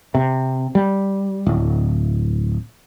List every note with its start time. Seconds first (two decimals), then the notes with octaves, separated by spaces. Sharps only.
0.15 C3
0.75 G3
1.46 D1